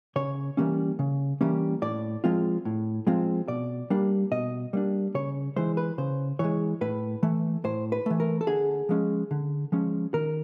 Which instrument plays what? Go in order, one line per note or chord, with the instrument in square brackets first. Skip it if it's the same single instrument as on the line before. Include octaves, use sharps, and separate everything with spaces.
[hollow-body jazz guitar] C#3 C#5
E3 G3 A#3 C#4
C#3
E3 G3 A#3 C#4
A2 D5
F3 G#3 C4 F4
A2
F3 G#3 C4 F4
B2 D5
G3 A#3 D4
B2 D#5
G3 A#3 D4
C#3 C#5
E3 G#3 C5
B4
C#3 C5
E3 G#3 C#5
A2 B4
E3 A3
A2 C5
B4
E3 A3
A#4
A4
D3 G#4
F3 G#3 C#4
D3
F3 G#3 C#4
D#3 A#4